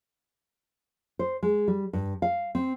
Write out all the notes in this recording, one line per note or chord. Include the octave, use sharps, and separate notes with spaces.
C5
G#3
G3
G2
F5
C4